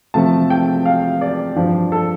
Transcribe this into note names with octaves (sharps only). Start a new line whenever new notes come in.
C3 F3 A3 A5
G5
F5
D5
G2 F3 D4
A4